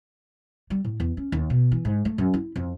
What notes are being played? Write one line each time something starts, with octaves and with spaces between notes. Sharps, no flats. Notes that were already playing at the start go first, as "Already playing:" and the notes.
G3
A2
E2
C#4
D#2
B2
E3
G#2
A3
F#2
E4
F2